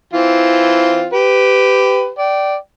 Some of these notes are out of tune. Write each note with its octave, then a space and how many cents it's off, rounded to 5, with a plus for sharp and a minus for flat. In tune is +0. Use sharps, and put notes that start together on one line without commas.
E3 +0 C4 +0 F4 +0
G4 +0 B4 +25
D5 +0 G5 -30